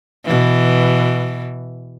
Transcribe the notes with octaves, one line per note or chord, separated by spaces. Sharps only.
B2 E3